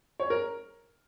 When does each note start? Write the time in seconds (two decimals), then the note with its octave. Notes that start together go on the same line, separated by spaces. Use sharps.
0.20 C#5
0.30 A#4